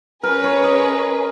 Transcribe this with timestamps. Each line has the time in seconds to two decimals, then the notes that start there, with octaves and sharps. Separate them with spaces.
0.23 C#4 G#4 A#4 B4
0.44 C#5
0.64 D#5